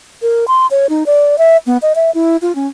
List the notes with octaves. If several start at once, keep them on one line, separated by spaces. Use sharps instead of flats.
A#4
C6
C#5
D#4
D5
E5
B3
D#5
E5
E4
F4
C#4